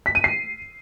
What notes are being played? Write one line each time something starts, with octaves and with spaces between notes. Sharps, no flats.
B6
D#7
C7